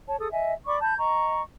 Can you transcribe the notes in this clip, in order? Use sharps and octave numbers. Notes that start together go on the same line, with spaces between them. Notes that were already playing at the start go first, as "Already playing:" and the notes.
C#5 A5
G#4 A4 D#6
D#5 E5 G#5
D5 B5 C#6 D6
A5 B5 G6
D#5 A#5 C#6